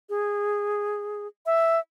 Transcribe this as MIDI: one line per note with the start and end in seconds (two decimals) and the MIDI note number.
0.10 1.27 68
1.46 1.80 76